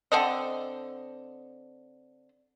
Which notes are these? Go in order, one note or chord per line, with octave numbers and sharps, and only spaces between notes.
D3 C4 A4 D#5